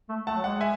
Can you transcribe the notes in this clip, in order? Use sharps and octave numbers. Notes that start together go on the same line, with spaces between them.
A3
A3 F#5 A5
F#3
G#3 F#5
E5 G#5